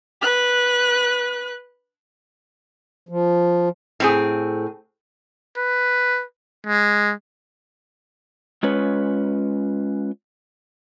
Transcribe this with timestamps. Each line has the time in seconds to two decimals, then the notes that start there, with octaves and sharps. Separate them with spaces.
0.21 B4 F#6
3.09 F3
4.00 A2 C4 G#4
5.57 B4
6.67 G#3
8.63 G#3 C#4 F4 B4 C#5